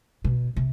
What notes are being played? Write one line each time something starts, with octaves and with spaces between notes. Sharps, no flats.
B2
C3